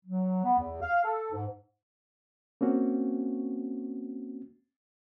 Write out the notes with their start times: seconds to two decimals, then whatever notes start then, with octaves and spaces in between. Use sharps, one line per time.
0.05 F#3
0.45 B3
0.60 E2
0.82 F5
1.05 A4
1.33 G#2
2.61 A#3 C4 C#4 F#4